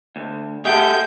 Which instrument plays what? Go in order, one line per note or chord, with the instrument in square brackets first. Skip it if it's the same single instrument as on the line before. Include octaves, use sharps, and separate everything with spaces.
[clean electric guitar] D2
[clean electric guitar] A3 G4 G#4 [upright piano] E5 F#5 A5 [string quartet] G6